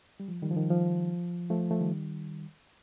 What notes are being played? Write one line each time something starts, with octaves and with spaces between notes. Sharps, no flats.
G3
F3
D#3 G3
F3
D#3
F3
F3 A3
F3 A3
D#3 G3